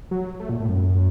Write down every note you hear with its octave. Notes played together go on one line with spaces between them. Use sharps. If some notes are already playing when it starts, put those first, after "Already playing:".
F#3
A3
A#2
A2
F#2